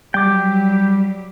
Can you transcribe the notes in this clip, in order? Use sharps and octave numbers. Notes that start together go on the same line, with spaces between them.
F#3 G3 G4 G5 D6